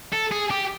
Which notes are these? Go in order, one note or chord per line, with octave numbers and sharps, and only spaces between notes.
A4
G#4
G4